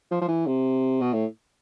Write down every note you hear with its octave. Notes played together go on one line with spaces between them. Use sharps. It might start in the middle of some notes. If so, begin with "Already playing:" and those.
F3
F3
E3
C3
B2
A2